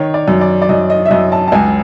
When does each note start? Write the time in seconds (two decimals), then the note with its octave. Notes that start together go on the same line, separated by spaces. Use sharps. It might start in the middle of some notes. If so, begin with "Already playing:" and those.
Already playing: D#3 C#5
0.14 D5
0.28 F#2
0.41 D5
0.62 D5
0.69 F#2 D#5
0.90 D#5
1.06 E5
1.11 F#2 D#5
1.32 A5
1.48 A5
1.52 C#2 G#5